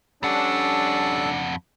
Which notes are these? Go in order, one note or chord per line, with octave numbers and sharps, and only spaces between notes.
F2 G3 C#4 D4 A4 F#5 A5